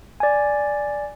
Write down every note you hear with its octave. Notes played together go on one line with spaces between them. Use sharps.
D5 G#5